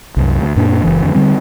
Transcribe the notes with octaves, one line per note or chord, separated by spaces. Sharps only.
C2 F#2
D2
F#2 A#2 A#3 D4
F#1 E3
F2 D3
D3 G3 C4